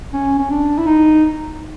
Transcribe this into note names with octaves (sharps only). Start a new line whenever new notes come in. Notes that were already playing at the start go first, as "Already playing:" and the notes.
C#4
C#4
D4
E4
D#4